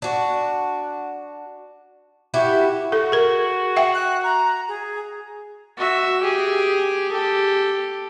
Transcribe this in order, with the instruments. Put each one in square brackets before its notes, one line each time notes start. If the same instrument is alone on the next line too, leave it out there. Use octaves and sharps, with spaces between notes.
[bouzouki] D4 F#4
E4 F#4 G4
[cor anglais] F#4 [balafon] A4
[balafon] G#4 A#4
E5 F#5 G5
[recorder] F#6
A#5
G#4
[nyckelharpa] F#4 E5
G4 G#4
G4 A4